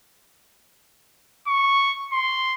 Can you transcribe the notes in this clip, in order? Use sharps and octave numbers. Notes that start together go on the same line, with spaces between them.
C#6
C6